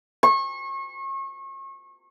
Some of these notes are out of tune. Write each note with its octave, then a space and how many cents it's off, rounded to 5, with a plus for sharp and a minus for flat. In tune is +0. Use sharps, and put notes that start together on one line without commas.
C#6 -35